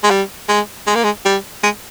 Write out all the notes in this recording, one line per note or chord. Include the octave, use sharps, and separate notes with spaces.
G#3
G3
G#3
G#3
A#3
G#3
G3
G#3